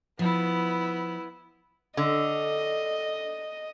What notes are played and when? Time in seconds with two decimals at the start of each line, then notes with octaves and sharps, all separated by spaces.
0.19 F3 B3 E4
1.97 D3 D#5